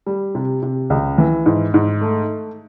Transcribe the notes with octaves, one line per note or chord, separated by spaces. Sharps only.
G3
C3
C3
C#2
E3
G#2
G#2
A3